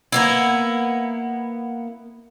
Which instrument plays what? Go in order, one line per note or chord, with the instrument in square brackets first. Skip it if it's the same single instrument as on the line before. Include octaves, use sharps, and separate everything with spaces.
[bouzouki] A#3 B3 E4